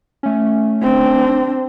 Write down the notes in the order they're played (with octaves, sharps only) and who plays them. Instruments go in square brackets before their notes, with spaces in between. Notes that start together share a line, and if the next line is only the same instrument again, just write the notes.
[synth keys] A3 C#4
[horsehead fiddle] C4 D4